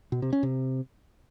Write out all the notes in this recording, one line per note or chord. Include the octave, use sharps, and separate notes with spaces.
B2
C3
C#4
C3